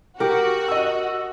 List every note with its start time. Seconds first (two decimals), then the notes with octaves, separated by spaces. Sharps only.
0.20 F#4 G4 A#4
0.68 D#5 E6